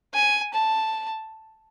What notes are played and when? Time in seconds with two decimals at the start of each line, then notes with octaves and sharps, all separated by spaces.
0.14 G#5
0.54 A5